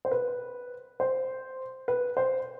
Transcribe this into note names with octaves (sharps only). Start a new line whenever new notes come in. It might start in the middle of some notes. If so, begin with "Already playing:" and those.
C5
B4
C5
B4
C5